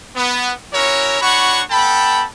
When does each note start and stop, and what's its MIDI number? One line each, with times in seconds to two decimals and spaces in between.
0.16 0.52 59
0.73 1.17 61
0.73 1.17 64
0.73 1.17 66
0.73 1.17 70
0.73 1.17 73
1.21 1.62 62
1.21 1.62 66
1.21 1.62 73
1.21 1.62 78
1.21 1.62 83
1.21 1.62 85
1.71 2.24 59
1.71 2.24 69
1.71 2.24 79
1.71 2.24 81
1.71 2.24 83